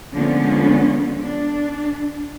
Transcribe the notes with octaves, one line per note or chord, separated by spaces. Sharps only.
D3 F3 G#3 A#3 B3 C#4
D4